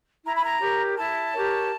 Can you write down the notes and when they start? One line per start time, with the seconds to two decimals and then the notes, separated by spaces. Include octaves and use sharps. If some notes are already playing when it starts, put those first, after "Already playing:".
0.23 E4 A#5
0.34 B5
0.43 A#5
0.59 G4 A#4 C#5
0.96 E4 A5
1.33 G4 A#4 C#5